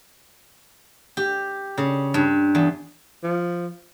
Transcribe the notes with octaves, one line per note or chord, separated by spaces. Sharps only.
G4
C#3
G2
E2
F3